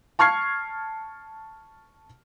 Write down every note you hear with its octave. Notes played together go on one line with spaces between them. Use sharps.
A5 C#6 F6 G#6 C7